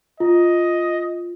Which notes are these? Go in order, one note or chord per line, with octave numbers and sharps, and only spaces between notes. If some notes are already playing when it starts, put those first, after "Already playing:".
F4 D#5